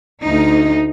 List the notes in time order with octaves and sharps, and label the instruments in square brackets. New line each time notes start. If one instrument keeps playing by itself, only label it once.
[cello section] D2 D#4